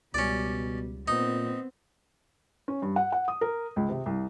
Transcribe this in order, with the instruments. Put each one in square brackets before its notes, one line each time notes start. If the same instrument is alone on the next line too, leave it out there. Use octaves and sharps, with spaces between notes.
[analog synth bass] C#2 [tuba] B2 [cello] G3 [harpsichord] C#4 D5
[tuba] A#2 [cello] B3 C4 [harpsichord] D#4
[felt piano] C#4
G2
F#5
F#5
D#6
A#4
C#2
C3
C2